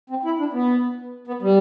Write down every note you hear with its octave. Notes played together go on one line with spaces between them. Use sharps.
C4
E4
D4
B3
B3
G3